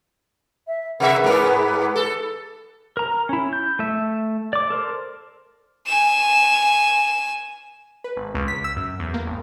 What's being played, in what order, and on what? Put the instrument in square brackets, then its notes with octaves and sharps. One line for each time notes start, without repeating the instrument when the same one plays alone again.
[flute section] E5
[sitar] C3 A#4 E5 [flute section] G#4 B4
[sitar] G#2 A#4
A4
[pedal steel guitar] A#4 A#5
C#4 E4
G6
A3 E5
D5 D6
A4 A#4 C5
[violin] G#5 E7
[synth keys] B4
G#1
C#2
B6
E6
F#2
E2
A#3
G#1